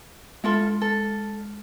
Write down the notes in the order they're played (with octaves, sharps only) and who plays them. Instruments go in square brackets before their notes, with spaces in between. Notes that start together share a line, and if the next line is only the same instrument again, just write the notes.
[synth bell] G#3 F6 [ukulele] E4 F4 A4
[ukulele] A4